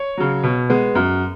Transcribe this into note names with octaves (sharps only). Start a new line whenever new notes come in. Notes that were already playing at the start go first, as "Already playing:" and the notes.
Already playing: C#5
C#3 F#3
B2
G#3 B3
F#2